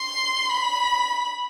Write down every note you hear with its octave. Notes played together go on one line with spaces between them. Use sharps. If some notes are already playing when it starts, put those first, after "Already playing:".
Already playing: C6
B5